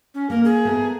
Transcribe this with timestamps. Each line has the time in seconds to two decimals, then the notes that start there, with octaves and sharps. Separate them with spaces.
0.14 C#4
0.30 A#3 A#4
0.44 G#4
0.65 A3 B3 A#4